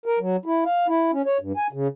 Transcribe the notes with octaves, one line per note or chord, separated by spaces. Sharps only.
A#4
F#3
E4
F5
E4
C#4
C#5
G2
G#5
C#3